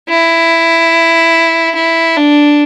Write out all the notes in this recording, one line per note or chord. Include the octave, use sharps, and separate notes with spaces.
E4
E4
D4